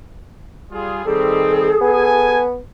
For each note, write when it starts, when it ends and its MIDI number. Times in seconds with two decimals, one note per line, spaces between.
0.72 1.03 55
0.72 1.03 65
0.72 1.03 68
1.06 1.72 51
1.06 1.72 55
1.06 1.72 60
1.06 2.33 68
1.06 1.78 69
1.81 2.58 59
1.81 2.43 69
1.81 2.43 80